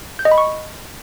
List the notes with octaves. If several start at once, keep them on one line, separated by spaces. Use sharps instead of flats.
G6
D#5
B5
C#6